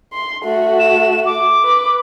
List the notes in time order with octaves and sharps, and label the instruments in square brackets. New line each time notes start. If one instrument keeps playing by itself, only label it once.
[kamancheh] C6
A3 F#4
[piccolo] E7
D6
[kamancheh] B4